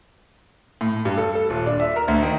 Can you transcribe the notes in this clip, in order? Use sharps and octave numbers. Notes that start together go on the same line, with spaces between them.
A2
G2
A4
A4
D#1
D4
E5
A#4
D2
D#3